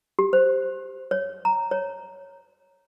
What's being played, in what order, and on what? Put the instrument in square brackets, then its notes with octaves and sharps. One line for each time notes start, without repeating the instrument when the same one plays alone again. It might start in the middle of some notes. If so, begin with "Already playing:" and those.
[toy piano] G4
C5
C#5
A#5
C#5